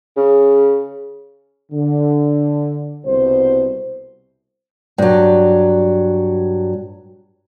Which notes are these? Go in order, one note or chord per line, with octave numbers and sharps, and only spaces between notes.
C#3
D3
C2 B2 C5
G2 F#3